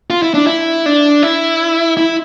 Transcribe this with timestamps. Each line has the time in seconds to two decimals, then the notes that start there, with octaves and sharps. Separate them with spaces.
0.10 F4
0.23 E4
0.34 D4
0.47 E4
0.86 D4
1.22 E4
1.97 E4